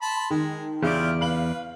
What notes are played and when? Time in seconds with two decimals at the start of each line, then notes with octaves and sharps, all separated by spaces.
0.02 A5 B5 C6
0.30 D#3 G#3
0.82 E2 C#3 E4 F4 G4 D5
1.21 B4 F5 F#7